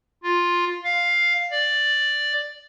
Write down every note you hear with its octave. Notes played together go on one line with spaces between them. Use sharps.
F4
F5
D5